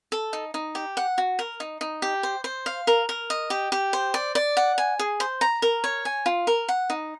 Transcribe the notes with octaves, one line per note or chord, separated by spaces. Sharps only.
A4
D#4
D#4
G4
F#5
F#4
A#4
D#4
D#4
G4
C5
C5
F5
A#4
A#4
D#5
G4
G4
C5
D5
D5
F#5
G#5
G#4
C5
A#5
A#4
C#5
G#5
F4
A#4
F#5
D#4